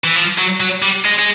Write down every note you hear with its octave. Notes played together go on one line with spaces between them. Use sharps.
E3
F3
F#3
F#3
G3
G#3
G#3